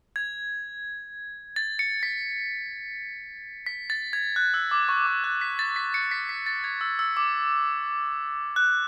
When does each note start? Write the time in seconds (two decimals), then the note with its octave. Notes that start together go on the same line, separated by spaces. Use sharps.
0.16 G#6
1.56 A6
1.79 C#7
2.03 B6
3.66 B6
3.90 A6
4.13 G#6
4.36 F#6
4.54 E6
4.71 D6
4.89 C#6
5.06 D6
5.24 F#6
5.41 B6
5.59 A6
5.76 B6
5.94 C#7
6.11 B6
6.29 B6
6.46 A6
6.64 G#6
6.81 E6
6.99 E6
7.17 D6
8.56 F#6